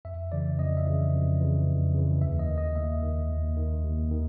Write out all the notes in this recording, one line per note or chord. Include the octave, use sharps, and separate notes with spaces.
F2 E5
C#3 E3 D5
F2 D#5
E5
C#3 E3
F2
C#3 E3
F2
C#3 E3
D#2 E5
D#5
D#3
D#5
D#2 E5
D#3
D#2
D#3
D#2
D#3